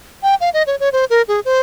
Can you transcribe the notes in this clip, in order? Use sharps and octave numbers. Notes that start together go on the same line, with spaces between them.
G5
F5
D#5
C#5
C#5
C5
A#4
G#4
C5